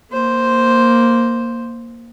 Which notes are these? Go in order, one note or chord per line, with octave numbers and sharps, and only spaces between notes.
A#3 C5